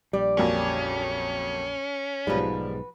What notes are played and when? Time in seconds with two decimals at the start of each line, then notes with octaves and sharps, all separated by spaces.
0.13 A#1 G3 D5
0.37 F2 F#3 A#3 C#4
2.27 B1 G#2 F3 G3 F#4 B4